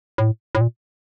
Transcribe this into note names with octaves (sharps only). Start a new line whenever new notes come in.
A2
A2
A#2